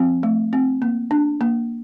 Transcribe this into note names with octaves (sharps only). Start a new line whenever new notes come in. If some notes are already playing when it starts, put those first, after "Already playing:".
Already playing: F3 C4
A3
C4
A#3
D4
A#3